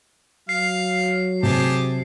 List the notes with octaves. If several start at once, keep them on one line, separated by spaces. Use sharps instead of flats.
F#3 F5 C7
C3 G4 G#4 A5